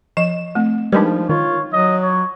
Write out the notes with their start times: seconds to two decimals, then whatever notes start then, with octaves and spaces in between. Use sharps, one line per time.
0.17 F3 D#5 E7
0.55 A3 C4
0.92 F3 G3 G#3 D4 D#4 A#4 B4
1.29 D#3 F4 C#5
1.73 F#3 D#5
2.03 C#5